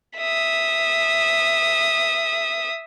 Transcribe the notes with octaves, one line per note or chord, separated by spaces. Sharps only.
E5 D#6